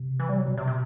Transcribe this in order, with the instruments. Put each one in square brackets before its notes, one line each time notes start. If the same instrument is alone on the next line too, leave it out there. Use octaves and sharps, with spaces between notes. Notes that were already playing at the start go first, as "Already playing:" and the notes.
Already playing: [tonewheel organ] C3
[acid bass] E3
G3
F#3
[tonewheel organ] B2
[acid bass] C3
C3